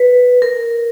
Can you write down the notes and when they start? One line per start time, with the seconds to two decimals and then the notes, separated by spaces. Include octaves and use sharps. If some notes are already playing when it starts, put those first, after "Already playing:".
Already playing: B4
0.42 A#4